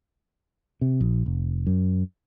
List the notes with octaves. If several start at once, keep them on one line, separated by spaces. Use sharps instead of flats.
C3
A#1
F1
F#2